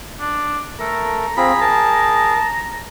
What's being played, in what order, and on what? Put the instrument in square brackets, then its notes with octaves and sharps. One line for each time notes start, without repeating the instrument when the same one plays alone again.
[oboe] D4
[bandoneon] A3 A4 A#4 [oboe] A#5
[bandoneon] C4 F4 [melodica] G#4 [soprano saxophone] B5
[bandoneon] A#4 [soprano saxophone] A5